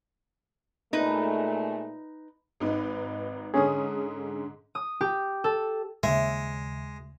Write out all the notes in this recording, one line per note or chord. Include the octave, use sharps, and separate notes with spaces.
A#2 G#3 A3 D#4 B4
G#1 D#4 B4
G#2 D3 C#4 G#4 D#6
D#6
G4
A4
D#2 C#3 G#3 E5